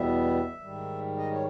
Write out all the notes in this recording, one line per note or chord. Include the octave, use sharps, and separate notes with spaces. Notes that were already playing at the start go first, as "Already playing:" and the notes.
Already playing: E2 B2 G3 B3 E5
G#2 D#3 G3
D#5
C#5